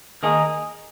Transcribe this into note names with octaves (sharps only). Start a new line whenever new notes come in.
D#3 A#3 D#4 G#4